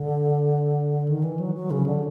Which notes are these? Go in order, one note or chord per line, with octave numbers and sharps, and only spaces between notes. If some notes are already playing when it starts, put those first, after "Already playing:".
Already playing: D3
D#3
E3
F#3
F#3
C#3
D3